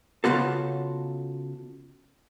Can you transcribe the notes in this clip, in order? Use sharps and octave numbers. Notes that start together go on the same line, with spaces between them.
C#3 B3 F4 F#4 A4